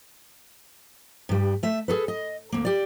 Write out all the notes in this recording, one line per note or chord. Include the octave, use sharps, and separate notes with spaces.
G2 G3
A3 E5
G#4 A4 B4
D#5
D2 A#3
G4 D5